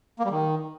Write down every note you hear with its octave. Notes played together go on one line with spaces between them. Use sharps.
A#3
G3
D#3